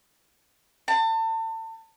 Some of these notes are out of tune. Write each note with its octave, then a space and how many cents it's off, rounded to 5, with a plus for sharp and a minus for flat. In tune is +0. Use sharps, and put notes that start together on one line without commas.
A5 +35